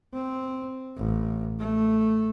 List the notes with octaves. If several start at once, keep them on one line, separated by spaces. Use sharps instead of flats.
C4
A1
A3